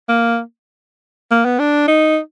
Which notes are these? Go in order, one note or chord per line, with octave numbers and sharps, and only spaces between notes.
A#3
A#3
B3
D4
D#4